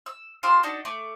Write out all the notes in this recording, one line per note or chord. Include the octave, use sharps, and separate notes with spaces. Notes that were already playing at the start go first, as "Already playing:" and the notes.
E6
F4 G4 C6 E6
D4 D#4 F#4 A4
A3 D6